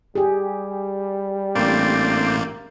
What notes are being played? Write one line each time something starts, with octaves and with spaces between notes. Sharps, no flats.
G3 G4 G#4
A1 A2 A#3 C4 D4